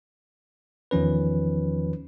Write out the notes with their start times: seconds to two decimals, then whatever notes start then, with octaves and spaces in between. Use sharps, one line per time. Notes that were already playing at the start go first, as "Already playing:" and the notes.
0.91 E2 D#3 F3 C#4 B4